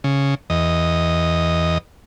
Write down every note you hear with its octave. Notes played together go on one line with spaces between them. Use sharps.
C#3
E2 D#5